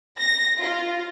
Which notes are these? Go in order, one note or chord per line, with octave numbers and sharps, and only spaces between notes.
A#6
F4